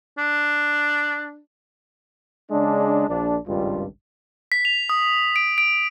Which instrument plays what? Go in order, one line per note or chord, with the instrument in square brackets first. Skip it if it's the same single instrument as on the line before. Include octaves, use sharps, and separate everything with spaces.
[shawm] D4
[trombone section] C#3 G#3 D4
A#1 D4
G#1 C#2 G2 G3 F4
[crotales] B6
F7
D#6
D7
D7